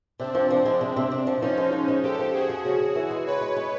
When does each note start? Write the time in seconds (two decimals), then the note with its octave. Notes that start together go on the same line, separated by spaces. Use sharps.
0.20 C3 C4 D4
0.35 F3
0.51 F3
0.65 G#3
0.81 C3
0.96 C3
1.11 C3
1.27 F3
1.42 F3 C#4 D#4
1.58 G#3
1.73 F3
1.88 G#3
2.04 F3 G4 A4
2.19 F3
2.34 F2 F#4 G#4
2.50 F3
2.64 C#3 F#4 G#4
2.80 C#3
2.95 E3
3.11 G#3
3.27 C#3 B4 C#5
3.41 G#3
3.57 G#3